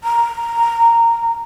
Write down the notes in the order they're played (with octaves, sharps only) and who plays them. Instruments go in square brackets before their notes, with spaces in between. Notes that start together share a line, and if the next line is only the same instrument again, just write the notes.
[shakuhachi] A#5